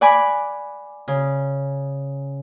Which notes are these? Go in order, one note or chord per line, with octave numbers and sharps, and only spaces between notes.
D5 F#5 G#5 B5 D6
C#3